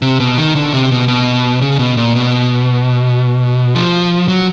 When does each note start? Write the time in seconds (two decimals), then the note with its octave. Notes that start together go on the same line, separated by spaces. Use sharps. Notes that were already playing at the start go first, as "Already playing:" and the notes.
0.02 C3
0.20 B2
0.38 D#3
0.55 D3
0.73 C3
0.91 B2
1.08 B2
1.61 C#3
1.79 B2
1.97 A#2
2.15 B2
3.75 F3
4.28 F#3